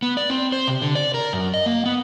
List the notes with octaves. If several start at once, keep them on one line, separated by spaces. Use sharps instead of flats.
B3
D5
C4
C5
C3
D3
D5
A#4
F#2
D#5
A#3
B3